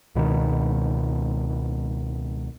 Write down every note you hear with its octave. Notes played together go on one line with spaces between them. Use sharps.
C#2 B2 D#3